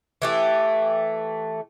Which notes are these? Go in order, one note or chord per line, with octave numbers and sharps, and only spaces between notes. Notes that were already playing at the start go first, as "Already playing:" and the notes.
E3 A3 G4